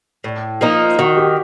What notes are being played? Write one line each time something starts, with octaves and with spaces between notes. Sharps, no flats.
A2
F3 A#3 D#4
D#3 F#4
G4